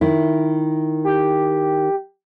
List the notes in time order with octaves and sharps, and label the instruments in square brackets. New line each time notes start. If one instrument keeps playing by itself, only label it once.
[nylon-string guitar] D#3 E4
[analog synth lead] G4